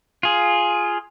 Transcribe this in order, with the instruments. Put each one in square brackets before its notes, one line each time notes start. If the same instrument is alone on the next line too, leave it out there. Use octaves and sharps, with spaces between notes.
[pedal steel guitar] F4 G#4